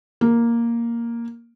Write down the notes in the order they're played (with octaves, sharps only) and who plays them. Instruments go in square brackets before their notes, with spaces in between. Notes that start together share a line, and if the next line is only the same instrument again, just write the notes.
[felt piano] A#3